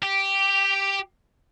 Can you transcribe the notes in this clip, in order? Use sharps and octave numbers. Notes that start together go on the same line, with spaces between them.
G4